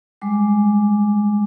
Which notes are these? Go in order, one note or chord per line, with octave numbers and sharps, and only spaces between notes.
G3 G#3 D6